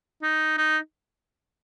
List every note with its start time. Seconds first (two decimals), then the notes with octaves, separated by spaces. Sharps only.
0.23 D#4
0.58 D#4